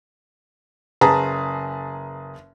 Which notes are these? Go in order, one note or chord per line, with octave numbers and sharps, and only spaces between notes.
F#1 G#4 B4 A5 A#5